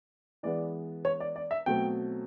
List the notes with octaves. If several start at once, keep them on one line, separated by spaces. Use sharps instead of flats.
E3 G#3 B3 D5
C#5
D5
D5
E5
B2 F#3 A3 C4 G5